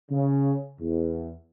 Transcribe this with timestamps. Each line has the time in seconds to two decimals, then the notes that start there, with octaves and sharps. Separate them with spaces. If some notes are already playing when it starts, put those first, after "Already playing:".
0.11 C#3
0.80 E2